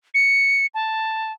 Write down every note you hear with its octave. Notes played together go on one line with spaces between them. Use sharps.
C#7
A5